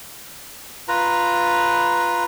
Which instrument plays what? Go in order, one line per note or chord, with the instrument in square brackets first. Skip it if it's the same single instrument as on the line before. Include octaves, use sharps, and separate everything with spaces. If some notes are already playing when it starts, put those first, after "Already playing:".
[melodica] F4 B4 A#5